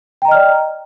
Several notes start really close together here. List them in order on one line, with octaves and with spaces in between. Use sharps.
G5 A#5 D#5 F6 D5